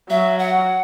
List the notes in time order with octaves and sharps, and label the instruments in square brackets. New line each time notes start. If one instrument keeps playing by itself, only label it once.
[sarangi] F#3 [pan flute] E5
[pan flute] F#5